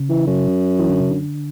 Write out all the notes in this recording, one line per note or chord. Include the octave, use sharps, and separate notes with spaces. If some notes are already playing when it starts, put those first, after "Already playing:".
Already playing: C#3
E3
F#2
E3
D3
C#3
D3